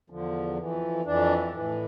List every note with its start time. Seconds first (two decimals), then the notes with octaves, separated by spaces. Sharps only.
0.10 E2 D3 F3
0.58 F2 E3
1.05 F2 E3 D4
1.53 A2 E3